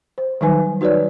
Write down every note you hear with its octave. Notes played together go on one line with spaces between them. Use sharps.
C5
D#3 F#3 G3 D#4 B4 G#5
D#4 F#4 B4 C#5 D5